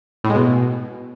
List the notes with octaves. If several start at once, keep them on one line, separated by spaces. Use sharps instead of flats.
A2
G#3
B2